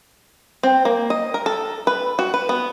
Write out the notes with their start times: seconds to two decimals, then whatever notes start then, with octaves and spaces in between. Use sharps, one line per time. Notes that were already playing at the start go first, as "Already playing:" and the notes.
0.63 C4
0.85 A#3
1.10 D#5
1.34 A#4
1.46 A4
1.87 B4
2.19 F#4
2.34 B4
2.49 B3